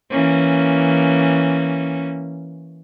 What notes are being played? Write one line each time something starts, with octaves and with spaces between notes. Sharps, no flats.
E3 A#3 C#4